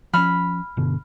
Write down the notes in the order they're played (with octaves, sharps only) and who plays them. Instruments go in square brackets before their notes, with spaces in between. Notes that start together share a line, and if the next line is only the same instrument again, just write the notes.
[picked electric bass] F3 C#4 [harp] B5 F6
[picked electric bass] G1 B2 D3